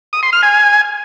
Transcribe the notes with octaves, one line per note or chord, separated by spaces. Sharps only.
D#6
C6
F6
G#5